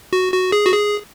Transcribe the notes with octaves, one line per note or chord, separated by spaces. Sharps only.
F#4
F#4
G#4
F#4
G#4